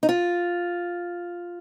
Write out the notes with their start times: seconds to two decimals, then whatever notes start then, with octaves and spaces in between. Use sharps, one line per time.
0.03 D#4
0.09 F4